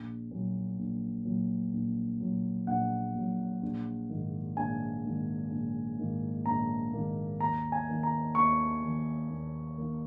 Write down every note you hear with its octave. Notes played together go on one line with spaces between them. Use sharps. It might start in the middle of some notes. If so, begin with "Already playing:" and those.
Already playing: A#1
A#2 F#3
A#1
A#2 F#3
A#1
A#2 F#3
A#1 F#5
A#2 F#3
A#1
G#2 D#3 A#3
A#1 G#5
G#2 D#3 A#3
A#1
G#2 D#3 A#3
A#1 A#5
G#2 D#3 A#3
D#2 A#5
G#5
D#3 A#3
A#5
D#2 C#6
D#3 A#3
D#2
D#3 A#3